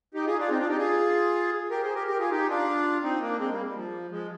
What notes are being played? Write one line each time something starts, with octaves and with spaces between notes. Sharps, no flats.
D#4 G4
F4 G#4
D4 F4
C4 D#4
D4 F4
D#4 G4
F4 G#4
G4 A#4
G#4 C5
G4 A#4
G4 A#4
F4 G#4
D#4 G4
D4 F4
C4 D#4
A#3 D4
G#3 C4
G3 A#3
G3
F3
F3 G#3